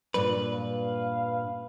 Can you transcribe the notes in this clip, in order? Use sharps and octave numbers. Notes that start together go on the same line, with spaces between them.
G2 A#2 B4
F5